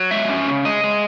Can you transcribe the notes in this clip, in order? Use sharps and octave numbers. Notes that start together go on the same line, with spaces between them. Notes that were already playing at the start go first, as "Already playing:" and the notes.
Already playing: F#3
G#3 E5
C#4
C#3
G#3 D#5
G#3